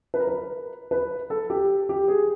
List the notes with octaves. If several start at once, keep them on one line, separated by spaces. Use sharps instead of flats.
B4
A#4
B4
B4
A4
G4
G4
G#4